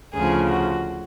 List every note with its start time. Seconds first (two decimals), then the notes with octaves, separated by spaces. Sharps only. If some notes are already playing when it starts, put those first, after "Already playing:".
0.14 D2 C#3 F3 G#4
0.49 F#4